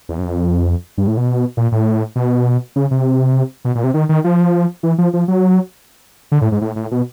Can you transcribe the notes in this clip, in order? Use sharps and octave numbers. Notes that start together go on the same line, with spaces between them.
E2
F#2
F2
G2
A2
B2
A#2
A2
B2
C#3
C3
B2
A#2
C3
D#3
D#3
F3
E3
F3
F3
F#3
D3
A2
G#2
A2
A2
B2